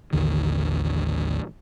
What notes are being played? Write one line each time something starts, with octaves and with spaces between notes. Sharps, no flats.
A1 D#2 D3 D#3